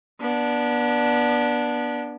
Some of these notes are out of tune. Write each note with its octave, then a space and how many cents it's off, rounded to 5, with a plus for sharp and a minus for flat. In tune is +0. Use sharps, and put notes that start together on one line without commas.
B3 -30 D4 +0